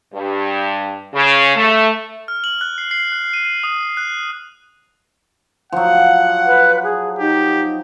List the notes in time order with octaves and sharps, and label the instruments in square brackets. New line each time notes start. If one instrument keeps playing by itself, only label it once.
[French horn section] G2
C#3
A3
[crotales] F6
F#7
F#6
C7
C7
F#6
D#7
D#7
D#6
F#6
[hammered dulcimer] F3 F#3 [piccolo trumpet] F#5
[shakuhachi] B4
G#4
[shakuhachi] D#4 [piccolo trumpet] G4